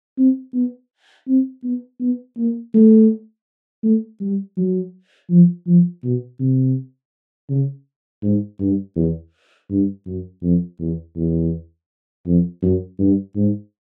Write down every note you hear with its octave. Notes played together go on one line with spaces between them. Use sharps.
C4
B3
C4
B3
B3
A#3
A3
A3
G3
F#3
F3
F3
B2
C3
C#3
G#2
G2
E2
G2
F#2
F2
E2
E2
F2
F#2
G2
G#2